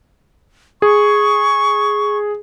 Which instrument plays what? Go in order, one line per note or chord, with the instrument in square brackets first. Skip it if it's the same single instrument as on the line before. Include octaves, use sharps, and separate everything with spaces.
[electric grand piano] G#4 [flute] C#6